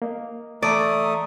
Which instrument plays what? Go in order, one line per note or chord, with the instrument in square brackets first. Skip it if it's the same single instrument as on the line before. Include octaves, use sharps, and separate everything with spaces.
[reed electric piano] A#3 D#5
[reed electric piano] E3 A5 [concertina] A3 D#6 [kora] D5 [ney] A#5